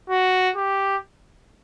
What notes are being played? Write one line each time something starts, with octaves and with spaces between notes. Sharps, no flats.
F#4
G4